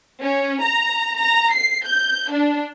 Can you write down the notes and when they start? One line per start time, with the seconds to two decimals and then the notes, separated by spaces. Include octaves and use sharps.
0.22 C#4
0.62 A#5
1.19 A#5
1.53 C7
1.85 G6
2.31 D4